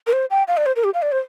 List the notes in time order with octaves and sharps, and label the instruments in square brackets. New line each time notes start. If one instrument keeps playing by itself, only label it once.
[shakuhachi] A#4
C5
G5
F5
D5
C5
A#4
G4
F5
D5
C5